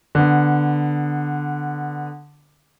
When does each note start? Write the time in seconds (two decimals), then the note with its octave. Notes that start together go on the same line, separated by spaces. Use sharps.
0.15 D3 B3